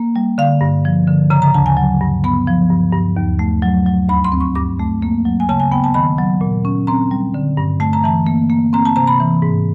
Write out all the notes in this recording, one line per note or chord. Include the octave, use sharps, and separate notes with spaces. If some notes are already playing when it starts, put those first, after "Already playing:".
Already playing: A#3
G3
D3 F5
G2
F3
D3
C#3 A#5
A#5
D2 A5
G#5
F#3
G2
B3 B5
F3
G2
G2
D#2
A3
F#3
F#3
D2 B5
C6
C4
C#6
G2 D6
A3
A#3
F#3
G#5
C#3 A5
G#5
B3 G5
A5
D#3 B5
F#3
A#2
C#4
C4 A#5
G3
D3
G2
A3 A5
A#5
E3 A5
A#3
A#3
C4 A#5
A5
C3 A#5
B5
E3
G#2